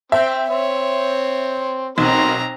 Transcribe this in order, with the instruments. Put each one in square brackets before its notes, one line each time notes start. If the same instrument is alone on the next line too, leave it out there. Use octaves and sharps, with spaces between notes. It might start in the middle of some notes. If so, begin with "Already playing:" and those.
[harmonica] C4 G5 [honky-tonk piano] E5
[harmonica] C4 [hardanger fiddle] C#5
[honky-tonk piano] B1 [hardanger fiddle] C4 A#5 [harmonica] F#4 A#4 C6